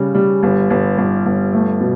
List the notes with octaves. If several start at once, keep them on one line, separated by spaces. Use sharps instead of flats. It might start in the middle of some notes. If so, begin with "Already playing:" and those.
Already playing: C#3 G3
G3
G1
G1
G1
G1
A3
B2